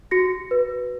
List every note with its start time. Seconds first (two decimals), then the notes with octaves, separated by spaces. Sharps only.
0.11 F#4 A#6 C#7
0.51 B4